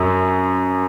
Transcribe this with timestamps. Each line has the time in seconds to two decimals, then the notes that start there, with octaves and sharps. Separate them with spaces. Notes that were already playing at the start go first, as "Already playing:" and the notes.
Already playing: F#2